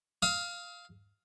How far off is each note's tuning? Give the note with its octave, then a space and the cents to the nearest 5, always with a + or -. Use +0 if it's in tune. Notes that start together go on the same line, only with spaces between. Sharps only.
F5 +0 D#6 +40